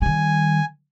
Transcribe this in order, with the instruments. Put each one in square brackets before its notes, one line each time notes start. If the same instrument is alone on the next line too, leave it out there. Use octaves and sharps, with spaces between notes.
[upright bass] D#3 G3 [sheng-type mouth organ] G#5